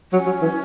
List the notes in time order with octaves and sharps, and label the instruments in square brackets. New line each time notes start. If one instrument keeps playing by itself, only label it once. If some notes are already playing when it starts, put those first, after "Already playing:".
[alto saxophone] F#3 [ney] C#4
[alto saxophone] F#3
E3